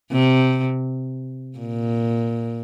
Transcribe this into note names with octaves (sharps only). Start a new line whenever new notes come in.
C3
A#2